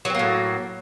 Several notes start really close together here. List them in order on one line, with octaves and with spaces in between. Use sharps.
F#3 C4 A#3 A2